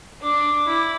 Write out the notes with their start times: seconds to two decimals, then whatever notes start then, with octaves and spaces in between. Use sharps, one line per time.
0.21 D4 D6
0.66 E4